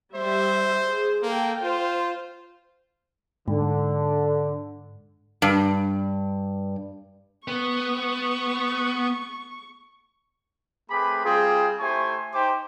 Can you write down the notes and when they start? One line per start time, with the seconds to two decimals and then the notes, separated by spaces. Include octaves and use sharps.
0.15 G3 C5 E5
0.87 G#4
1.22 A#3 A4 G5
1.63 F4 C5
3.48 G#2 D3
5.42 G2
7.48 B3 C#6
10.91 A3 C4 G#4 B4 B5 D6
11.25 G3 C4 F4 G#4
11.80 A3 E4 G4 C5 G#5 C#6
12.34 D#4 G4 C5 G5 D6